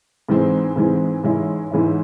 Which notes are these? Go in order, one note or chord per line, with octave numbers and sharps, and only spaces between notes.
G#2 E3 G#3 C4
G#2 E3 G#3 C4
G#2 E3 G#3 C#4 E4
G#2 E3 G#3 C#4 E4